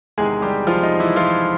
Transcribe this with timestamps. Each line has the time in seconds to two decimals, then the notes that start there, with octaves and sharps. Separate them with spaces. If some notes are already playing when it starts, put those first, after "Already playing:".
0.18 E2 C3 D#3 G#3 G#4
0.42 G3 G4
0.67 F3 F4
0.83 D#4
1.00 E3 E4
1.16 F3 F4